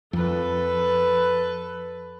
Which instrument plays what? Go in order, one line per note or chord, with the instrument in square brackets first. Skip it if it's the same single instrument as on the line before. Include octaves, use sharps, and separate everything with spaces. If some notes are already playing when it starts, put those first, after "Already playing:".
[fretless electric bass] F2 [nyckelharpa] A4 B4